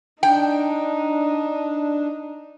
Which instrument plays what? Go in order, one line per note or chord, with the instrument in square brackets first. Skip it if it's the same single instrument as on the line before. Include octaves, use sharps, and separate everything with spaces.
[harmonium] D4 [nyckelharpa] D#4 [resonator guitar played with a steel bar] G5